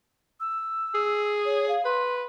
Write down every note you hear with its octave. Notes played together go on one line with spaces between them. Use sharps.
E6
G#4
C#5
F5
B4 C6